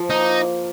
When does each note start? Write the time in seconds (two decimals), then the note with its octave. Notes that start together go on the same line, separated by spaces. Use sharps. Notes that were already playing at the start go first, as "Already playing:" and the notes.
Already playing: F3
0.10 A#3 D#4